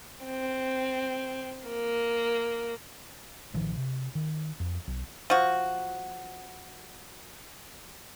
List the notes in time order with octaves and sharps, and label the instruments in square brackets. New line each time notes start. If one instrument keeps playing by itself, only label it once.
[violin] C4
A#3
[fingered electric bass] A1 D#3 F3
C3
D#3
F2
B1
[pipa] F3 F#4